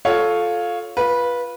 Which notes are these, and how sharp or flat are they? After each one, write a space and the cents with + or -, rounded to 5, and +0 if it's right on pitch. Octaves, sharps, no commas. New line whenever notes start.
F4 +10 A4 -10 C#5 +0
F4 +0 B4 -15